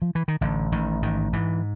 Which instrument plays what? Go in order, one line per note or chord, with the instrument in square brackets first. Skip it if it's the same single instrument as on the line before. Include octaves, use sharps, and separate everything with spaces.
[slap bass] F3
E3
D#3
A1 D3
A1 D#3
G#2 D#3
G#2 E3